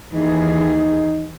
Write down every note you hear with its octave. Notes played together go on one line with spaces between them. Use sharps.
D#2 E3 D#4 G#4